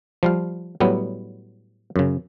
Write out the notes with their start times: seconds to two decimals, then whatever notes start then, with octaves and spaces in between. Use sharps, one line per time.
0.23 F3 G3 F5
0.80 A2 F#3 G3 B3
1.96 F#2 C#3